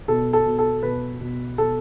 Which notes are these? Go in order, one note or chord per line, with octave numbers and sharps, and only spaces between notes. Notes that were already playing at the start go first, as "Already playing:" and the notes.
B2 A4
A4
B2
A4
B2 B4
B2
B2 A4